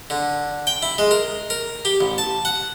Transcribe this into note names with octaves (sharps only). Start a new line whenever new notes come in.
D3
G5
E4
G#3
A#4
A#4
G4
A1
A5
F#5